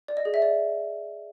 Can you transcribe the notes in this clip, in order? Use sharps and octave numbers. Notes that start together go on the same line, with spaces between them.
D5
D#5
G#4
E5
D5